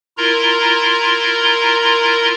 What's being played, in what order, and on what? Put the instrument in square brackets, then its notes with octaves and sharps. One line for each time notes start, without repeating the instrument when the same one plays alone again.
[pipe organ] E4 F4 A#4 A#5 C6